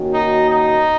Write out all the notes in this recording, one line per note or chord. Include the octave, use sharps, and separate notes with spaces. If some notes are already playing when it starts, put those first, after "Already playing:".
Already playing: D#3 A#3 C#4 F#4
D#4
D#4